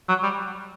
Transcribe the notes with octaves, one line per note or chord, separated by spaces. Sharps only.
F#3
G3